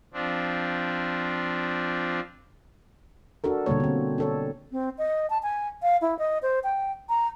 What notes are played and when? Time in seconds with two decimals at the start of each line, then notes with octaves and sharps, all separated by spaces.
0.13 F3 C4 D4
3.44 D4 F#4 A4 A#4
3.66 B2 D3 G3 A#3 C#5
3.80 D3 C4
4.18 D4 A4 C#5
4.72 C4
4.98 D#5
5.30 A5
5.43 G#5
5.83 F5
6.01 E4
6.19 D#5
6.42 C5
6.64 G5
7.09 A#5